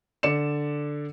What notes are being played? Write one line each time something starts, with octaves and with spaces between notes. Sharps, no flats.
D3 D5 C#7 E7